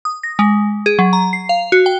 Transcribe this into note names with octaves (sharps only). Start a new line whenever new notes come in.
D#6
A#6
G#3
G#4
F#3
A#5
C7
F5
F#4
G5